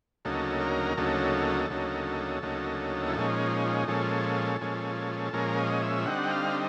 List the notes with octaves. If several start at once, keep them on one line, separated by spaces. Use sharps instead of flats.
D2 C#3 F#3 A#3 D#4 A4
A#4
D2 C#3 F#3 A#3 D#4 A4
D2 C#3 F#3 A#3 D#4
D2 C#3 F#3 A#3 D#4
E4
A#2 F3 G#3 C#4 D#4
A#2 F3 G#3 C#4 A4
A#2 F3 G#3 C#4
A#2 F3 G#3 C#4 A#4
D#5
E5
D3 G3 C4 D#4 F#5
F5